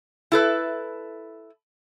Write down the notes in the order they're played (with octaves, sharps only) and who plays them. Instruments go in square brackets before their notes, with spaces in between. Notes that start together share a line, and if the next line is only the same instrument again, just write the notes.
[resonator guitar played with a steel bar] E4 A4 B4